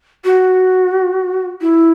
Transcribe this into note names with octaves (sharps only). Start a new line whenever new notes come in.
F#4
E4